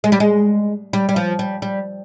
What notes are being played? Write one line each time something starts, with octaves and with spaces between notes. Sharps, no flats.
G#3
G3
G#3
G3
G3
F3
G3
G3